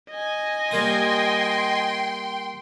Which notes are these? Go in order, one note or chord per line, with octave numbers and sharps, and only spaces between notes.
D#5 G#5
G3 A#3 G5 C6 D#6